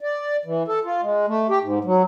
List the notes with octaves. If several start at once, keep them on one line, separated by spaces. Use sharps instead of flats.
D5
E3
A4
F4
G#3
A3
G4
G#2
F#3